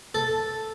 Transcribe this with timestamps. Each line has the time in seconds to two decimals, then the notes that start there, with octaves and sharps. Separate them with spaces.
0.15 A4